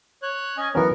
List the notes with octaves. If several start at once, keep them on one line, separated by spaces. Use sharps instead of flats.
C#5 F#6
C#4 D#5 G#5
E3 F#3 B3 C#4 A#4